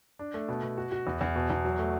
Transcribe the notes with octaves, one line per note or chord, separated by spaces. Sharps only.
D4
A3
B2
B2
F#4
F#4
E2
E2
B2
E2
F#3
A3